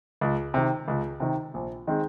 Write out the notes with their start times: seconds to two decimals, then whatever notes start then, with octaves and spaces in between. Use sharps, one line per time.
0.21 C#2
0.54 C3 D#3
0.88 C#2
1.20 C3 D#3
1.54 A#1
1.87 D#3 G#3 C4